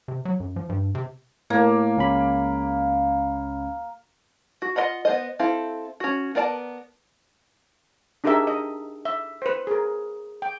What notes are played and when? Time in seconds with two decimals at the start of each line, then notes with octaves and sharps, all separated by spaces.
0.08 C3
0.25 F#3
0.40 F#2
0.56 F3
0.69 G2
0.95 C3
1.50 A2 A#3
1.96 C#2 C#4 B5
4.62 F#4
4.76 F4 A#4 D#5 F#5 B5
5.05 B3 C5 D#5
5.40 C4 E4 A4 F5
6.00 C#4 F#4
6.35 B3 A#4 D5 F5 A5
8.24 D4 D#4 G4 G#4 A#4 E5
8.47 D#5
9.05 E5
9.42 B4 C5
9.67 G#4 A#4
10.42 G5